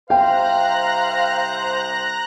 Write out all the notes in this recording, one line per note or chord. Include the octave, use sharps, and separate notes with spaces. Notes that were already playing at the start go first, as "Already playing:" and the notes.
C2 C5 F5 G5 A#5 F#6 A#6